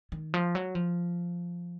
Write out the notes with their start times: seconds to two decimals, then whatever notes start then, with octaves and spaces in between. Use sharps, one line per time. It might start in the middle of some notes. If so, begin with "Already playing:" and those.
0.12 D#3
0.34 F3
0.55 F#3
0.75 F3